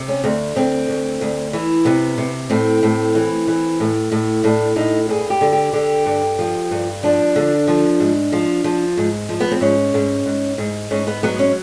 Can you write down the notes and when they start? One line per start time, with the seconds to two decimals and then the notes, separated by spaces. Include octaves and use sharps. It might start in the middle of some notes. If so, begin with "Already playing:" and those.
Already playing: C3
0.08 C#4
0.24 D2 C4
0.56 D2 C4
0.88 D2
1.21 D2
1.53 E3
1.85 C3 B3
2.18 C3
2.50 A2 C4
2.83 A2
3.15 E3
3.48 E3
3.80 A2
4.12 A2
4.44 A2 D4
4.76 A2 D#4
5.09 G2 G#4
5.30 G4
5.41 D3
5.52 G4
5.73 D3 G4
6.06 G2
6.39 F3
6.71 G2
7.03 F3 D4
7.36 D3
7.67 F3
8.00 G#2
8.32 F3
8.64 F3
8.97 G#2
9.29 F3
9.40 B3
9.52 C4
9.61 G#2 C#4
9.94 G#2
10.26 G#2
10.58 G#2
10.91 G#2 C#4
11.07 B3
11.23 F#3 B3
11.39 C#4